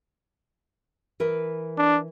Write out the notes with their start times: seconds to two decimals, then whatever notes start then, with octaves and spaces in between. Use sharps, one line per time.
1.20 E3 A#4 B4
1.78 D4